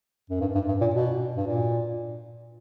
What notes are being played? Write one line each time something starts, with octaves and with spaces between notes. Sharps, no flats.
F#2
G2
G2
G2
A#2
B2
G2
A#2